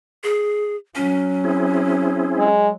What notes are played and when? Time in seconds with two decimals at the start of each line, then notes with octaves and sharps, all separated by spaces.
0.24 G#4
0.96 F#3 C#4
1.44 C4 E4 G#4
2.38 G#3